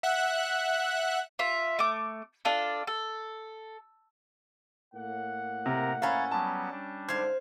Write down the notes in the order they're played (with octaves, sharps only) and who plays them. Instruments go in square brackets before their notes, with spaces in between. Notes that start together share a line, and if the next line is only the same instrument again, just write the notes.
[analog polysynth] E5 F#5 F#6
[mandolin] F4 E5
A3 D6
D4 F4 A4
A4
[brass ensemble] A2 A#3 F#5
[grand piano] C3 [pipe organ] A#4 A#5
[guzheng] C#4 E4 [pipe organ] C#5 A6 [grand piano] F5 A#5 B5
[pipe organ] F#3 G3 B3 [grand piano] A5
[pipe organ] G3 D4
[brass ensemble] G#2 D3 [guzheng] C5 F5 [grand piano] G#6